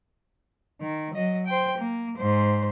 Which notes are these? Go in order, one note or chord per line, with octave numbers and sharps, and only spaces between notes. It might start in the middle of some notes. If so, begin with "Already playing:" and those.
D#3
F#3 D#5
C5 G5
A#3
G#2 C5